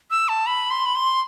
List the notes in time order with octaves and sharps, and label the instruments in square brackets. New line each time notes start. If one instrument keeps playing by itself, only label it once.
[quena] E6
A5
B5
C6
B5
C6